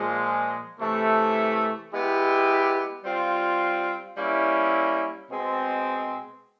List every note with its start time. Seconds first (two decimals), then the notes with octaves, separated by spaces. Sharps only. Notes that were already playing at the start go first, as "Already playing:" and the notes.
Already playing: A#2 F3 G#3
0.80 C3 E3 A3
1.92 G#3 B3 E4 G4
3.04 G3 C4 F4
4.17 G3 A#3 C#4 E4
5.30 B2 G#3 C4